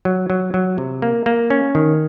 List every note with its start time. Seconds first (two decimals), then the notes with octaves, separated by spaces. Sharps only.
0.05 F#3
0.30 F#3
0.54 F#3
0.78 C3
1.02 A#3
1.26 A#3
1.50 C#4
1.75 D#3